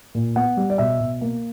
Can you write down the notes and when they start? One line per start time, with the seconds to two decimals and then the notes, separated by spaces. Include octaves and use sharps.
0.15 A#2
0.36 B3 F#5
0.57 G3
0.70 D5
0.78 B2 E5
1.00 B2
1.21 A#3